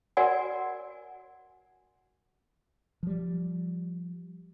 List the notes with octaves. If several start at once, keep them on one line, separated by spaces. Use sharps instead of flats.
F#4 A#4 D5 F#5 G#5
F3 G3